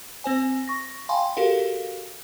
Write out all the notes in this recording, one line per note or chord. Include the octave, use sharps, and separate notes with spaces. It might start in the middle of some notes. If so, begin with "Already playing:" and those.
C4 C5 G#5
C#6 A#6
F5 G5 G#5 B5 C6
F#4 G4 A4 A#4 F5